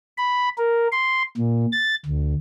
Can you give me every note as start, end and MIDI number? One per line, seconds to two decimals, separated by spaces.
0.18 0.49 83
0.58 0.88 70
0.92 1.23 84
1.37 1.66 46
1.72 1.95 93
2.06 2.34 38